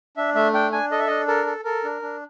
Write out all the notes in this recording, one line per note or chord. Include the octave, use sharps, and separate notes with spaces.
D4 E5
A3 E5
D4 G5
D4 G#5
A4 D#5
E5
D4 D#5
A4 A#4
A4
A4 A#4
D4
D4